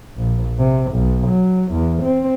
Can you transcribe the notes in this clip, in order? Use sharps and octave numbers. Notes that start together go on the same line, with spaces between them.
A#1
C3
B1
F#3
E2
C4